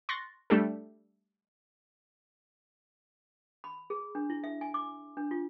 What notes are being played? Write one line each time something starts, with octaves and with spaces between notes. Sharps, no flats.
C6 C#6 F#6 A6 A#6
G3 A3 D4 G4 A4
B5
G#4
D4
E4
E5
G#5
D6
D4
F4